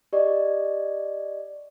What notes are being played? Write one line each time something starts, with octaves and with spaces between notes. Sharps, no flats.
G4 D5 D#5